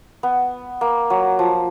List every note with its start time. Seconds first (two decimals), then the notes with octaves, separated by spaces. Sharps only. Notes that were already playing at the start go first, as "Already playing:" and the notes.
0.23 B3
0.81 A#3
1.10 F#3
1.39 F3